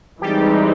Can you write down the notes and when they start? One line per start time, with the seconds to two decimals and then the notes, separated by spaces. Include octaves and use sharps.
0.21 E3 G3 G#3 C4 D#4 G4